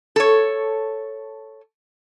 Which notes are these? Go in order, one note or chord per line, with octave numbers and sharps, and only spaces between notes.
A4 C#5